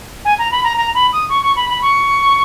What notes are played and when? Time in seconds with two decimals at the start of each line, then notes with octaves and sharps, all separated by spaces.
0.25 G#5
0.39 A#5
0.51 B5
0.64 A#5
0.77 A#5
0.95 B5
1.13 D#6
1.30 C#6
1.43 C#6
1.56 B5
1.69 B5
1.82 C#6